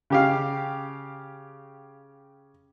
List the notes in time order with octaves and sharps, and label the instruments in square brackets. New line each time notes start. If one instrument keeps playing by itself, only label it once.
[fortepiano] C#3 G4 F5